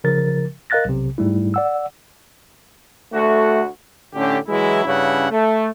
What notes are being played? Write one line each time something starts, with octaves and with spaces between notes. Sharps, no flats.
C#3 F3 A#4 A6
A#4 D#5 F5 F#6 A6 A#6
B1 C3
G#2 G3 A3 E4
D5 F#5 E6
D2 A3 F#4
A2 D3 C#4 G4
E3 F#3 G#3 E4
G2 C#3 C#4 E4 F#5
A3